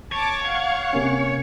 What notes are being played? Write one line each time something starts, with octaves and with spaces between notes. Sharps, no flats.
C#5 A5 D6
F5 F#5 G#6
C3 A#3 C#4